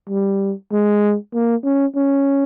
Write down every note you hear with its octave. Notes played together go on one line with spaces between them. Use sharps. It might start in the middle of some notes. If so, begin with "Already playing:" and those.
G3
G#3
A#3
C#4
C#4